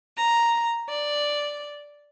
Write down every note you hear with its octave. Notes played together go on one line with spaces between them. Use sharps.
A#5
D5